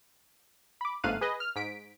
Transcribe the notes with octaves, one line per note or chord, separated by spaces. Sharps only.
B5 D6
G1 G#2 A3 F5 F#6 D#7
G#4 B4 D#5
F6
G#2 B6 D7